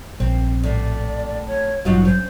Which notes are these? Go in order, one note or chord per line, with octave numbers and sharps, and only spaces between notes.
A#1 C4
A2 D5
C#5
A1 G2 A#2 F#3 D#4 F4 F#4
C#4 C5